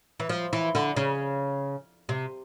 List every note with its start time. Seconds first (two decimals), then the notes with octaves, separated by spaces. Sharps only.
0.20 E3
0.29 F3
0.53 E3
0.75 D3
0.96 C#3
2.09 C3